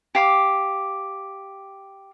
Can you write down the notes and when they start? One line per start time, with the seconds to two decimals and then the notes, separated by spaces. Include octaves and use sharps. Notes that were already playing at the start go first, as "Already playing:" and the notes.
0.15 G4 F5 D6